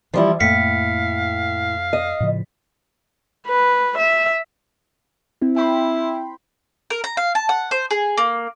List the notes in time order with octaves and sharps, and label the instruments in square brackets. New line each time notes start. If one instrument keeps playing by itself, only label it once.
[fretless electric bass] E3 [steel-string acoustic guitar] F3 G3 E4
[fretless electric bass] F2 A#3 [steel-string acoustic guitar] A2 [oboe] F5 [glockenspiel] B6 C#7
[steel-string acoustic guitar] D#5
[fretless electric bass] A2 C#3 F3
[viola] B4
E5
[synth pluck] C4 E4
[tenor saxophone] E4 [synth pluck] G5 B5 C6
[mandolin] A#4
A#5
F5
A5
F#5
C5
G#4
A#3